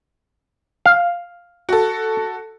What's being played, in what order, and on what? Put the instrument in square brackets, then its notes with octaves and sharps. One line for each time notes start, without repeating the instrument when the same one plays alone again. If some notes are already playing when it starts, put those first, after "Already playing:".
[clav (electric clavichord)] F5
[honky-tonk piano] F#4 A4